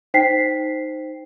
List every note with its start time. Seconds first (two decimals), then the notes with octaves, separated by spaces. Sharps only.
0.14 D#4 C5 G5 B6 C7